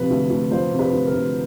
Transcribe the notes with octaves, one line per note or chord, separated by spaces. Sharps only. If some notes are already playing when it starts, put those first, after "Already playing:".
Already playing: C3 F3 B4
D2
D2
F3 C5
C3
B4
D2
A#4
D2